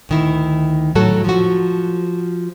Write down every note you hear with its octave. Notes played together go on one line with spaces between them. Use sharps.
D2 D#3 E4
A2 F#3 F#4 A4
F3 F#4